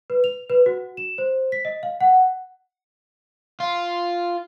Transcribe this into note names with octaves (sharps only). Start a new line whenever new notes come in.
B4
F7
B4
F#4
E7
C5
B6
D#5
F5
F#5
F4